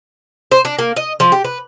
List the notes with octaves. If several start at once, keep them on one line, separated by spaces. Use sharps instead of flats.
C5
D4
A#3
D#5
F3
G4
B4